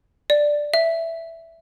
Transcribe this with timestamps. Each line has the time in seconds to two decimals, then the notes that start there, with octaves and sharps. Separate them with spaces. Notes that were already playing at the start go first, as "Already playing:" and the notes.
0.30 D5
0.74 E5